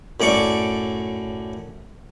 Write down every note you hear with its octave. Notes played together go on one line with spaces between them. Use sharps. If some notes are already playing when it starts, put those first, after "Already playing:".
F#2 A2 D5 A5 C#6 D6